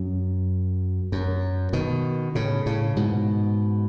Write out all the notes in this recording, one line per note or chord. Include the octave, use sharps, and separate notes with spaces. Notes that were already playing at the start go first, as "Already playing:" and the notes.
Already playing: F#2
F#2
B2 D#3
A2 C#3
A2 C#3
G#2 B2